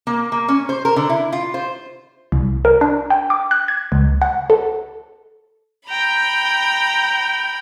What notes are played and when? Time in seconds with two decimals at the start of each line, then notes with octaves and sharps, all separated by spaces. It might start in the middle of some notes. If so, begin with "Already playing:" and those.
0.07 A#3
0.32 A#3
0.48 C#4
0.69 C5
0.85 A#4
0.96 D3
1.10 E4
1.32 F4
1.54 C5
2.32 C2
2.65 A#4
2.81 D4
3.10 G5
3.30 D6
3.51 F#6
3.68 G#6
3.92 C#2
4.22 F#5
4.50 A4
5.87 G5 A#5 B5